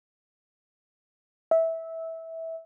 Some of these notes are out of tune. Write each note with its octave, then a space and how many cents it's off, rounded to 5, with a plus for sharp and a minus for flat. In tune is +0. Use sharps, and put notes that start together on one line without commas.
E5 -15